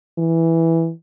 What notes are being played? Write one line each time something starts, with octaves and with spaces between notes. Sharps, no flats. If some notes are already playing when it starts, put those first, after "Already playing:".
E3